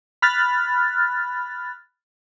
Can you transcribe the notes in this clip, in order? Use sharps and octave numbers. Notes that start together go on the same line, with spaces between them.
B5 F6 F#6 A6